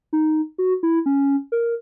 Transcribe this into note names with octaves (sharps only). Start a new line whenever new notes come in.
D#4
F#4
E4
C#4
A#4